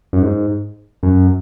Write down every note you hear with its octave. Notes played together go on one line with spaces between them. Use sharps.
F#2
G#2
F#2